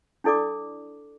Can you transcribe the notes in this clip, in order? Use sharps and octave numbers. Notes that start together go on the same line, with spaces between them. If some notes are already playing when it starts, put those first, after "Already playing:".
D4 E4 A4 D5 D6